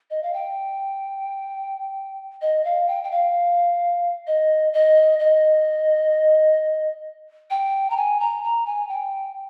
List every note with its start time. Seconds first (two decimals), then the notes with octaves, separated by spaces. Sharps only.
0.10 D#5
0.23 F5
0.34 G5
2.41 D#5
2.65 F5
2.88 G5
3.04 G5
3.11 F5
4.27 D#5
4.73 D#5
5.19 D#5
7.50 G5
7.90 A#5
7.97 G#5
8.20 A#5
8.44 A#5
8.66 G#5
8.89 G5